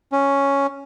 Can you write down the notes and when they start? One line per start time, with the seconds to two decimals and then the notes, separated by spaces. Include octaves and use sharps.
0.12 C#4